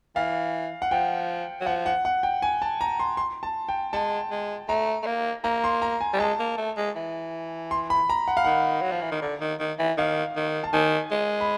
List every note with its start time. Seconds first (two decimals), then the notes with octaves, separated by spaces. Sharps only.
0.16 E3 F5
0.82 F#5
0.91 F3 G5
1.61 F#3
1.66 F3 F#5
1.86 F#5
2.05 F#5
2.23 G5
2.42 G#5
2.62 A5
2.81 A#5
3.00 C6
3.17 C6
3.43 A5
3.69 G5
3.93 G#3 A5
4.31 G#3
4.68 A3 A#5
5.03 A3
5.06 A#3
5.44 A#3 A#5
5.64 C6
5.82 A#5
6.01 G#5
6.14 G3
6.20 G#3 A5
6.39 A#3
6.58 A3
6.77 G#3
6.96 E3
7.71 C6
7.90 B5
8.10 A#5
8.28 F#5
8.37 F5
8.45 D#3 F#5
8.82 F#3
8.92 F3
9.02 E3
9.12 D#3
9.22 D3
9.41 D#3
9.59 D#3
9.79 E3
9.98 D#3 F5
10.36 D#3
10.64 A5
10.73 D#3 G#5
11.11 G#3
11.41 B5